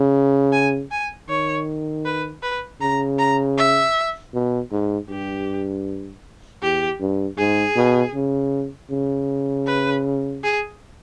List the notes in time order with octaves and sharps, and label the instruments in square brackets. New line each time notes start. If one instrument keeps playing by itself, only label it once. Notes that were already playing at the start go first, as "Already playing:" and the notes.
Already playing: [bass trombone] C#3
[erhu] G#5
G#5
[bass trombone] D#3 [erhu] C#5
[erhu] B4
B4
[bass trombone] C#3 [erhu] A#5
[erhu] A#5
E5
[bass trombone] B2
G#2
[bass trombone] G2 [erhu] G4
[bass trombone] E2 [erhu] G4
[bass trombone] G2
[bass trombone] G#2 [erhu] G#4
[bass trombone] B2
C#3
C#3
[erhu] B4
G#4